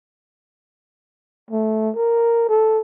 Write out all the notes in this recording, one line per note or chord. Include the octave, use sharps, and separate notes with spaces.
A3
A#4
A4